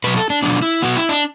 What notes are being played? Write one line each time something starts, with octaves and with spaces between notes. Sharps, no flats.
B2 F#3 B3 B4
A4
D4
B2 F#3 B3 D4
E4
B2 F#3 B3 F#4
E4
D4